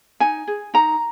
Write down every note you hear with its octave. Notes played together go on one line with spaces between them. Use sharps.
D#4 G#5
G#4
D#4 A#5